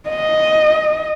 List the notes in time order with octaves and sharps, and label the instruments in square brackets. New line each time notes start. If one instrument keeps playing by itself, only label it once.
[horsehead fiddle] D#5